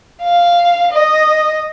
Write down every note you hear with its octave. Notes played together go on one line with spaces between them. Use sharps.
F5
D#5